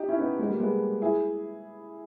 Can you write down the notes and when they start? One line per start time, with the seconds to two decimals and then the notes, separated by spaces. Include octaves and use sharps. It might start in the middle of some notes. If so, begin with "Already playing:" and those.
Already playing: D#4 G4
0.08 C#4 E4
0.19 B3 D#4
0.39 G#3 B3
0.49 G3 A#3
0.60 G#3 B3
1.02 E4 G#4